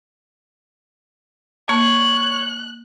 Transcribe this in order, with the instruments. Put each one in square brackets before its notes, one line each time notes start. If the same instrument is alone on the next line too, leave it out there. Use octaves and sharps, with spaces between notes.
[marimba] A#3 A5 [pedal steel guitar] C#5 [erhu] F#6